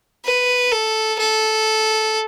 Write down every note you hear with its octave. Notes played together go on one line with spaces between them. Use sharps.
B4
A4
A4